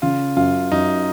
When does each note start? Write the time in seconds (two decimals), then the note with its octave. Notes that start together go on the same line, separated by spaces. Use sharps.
0.02 C#3 F4
0.36 F#2 F4
0.72 F#2 D#4